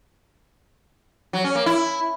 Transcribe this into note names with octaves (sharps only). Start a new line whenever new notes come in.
F#3
C#4
A#3
E4